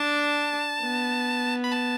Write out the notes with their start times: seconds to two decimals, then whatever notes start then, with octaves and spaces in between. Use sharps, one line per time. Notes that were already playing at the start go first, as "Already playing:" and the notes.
Already playing: D4 A5
0.82 B3
1.64 B5
1.72 A5